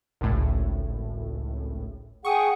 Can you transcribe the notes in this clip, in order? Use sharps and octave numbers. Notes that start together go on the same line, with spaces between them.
G#1 C#2 A2
G#4 F#5 G5 C#6 D#6